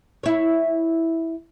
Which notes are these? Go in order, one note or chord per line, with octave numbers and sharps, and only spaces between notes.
E4 C#5